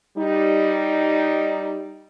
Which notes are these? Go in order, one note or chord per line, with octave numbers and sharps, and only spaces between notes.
G3 D#4